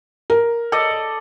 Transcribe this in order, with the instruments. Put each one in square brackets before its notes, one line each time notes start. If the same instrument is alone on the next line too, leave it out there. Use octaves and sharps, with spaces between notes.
[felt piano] A#4
[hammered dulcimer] A4 D5 D#5